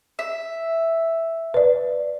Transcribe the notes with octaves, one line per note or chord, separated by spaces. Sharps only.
E5
B4 D5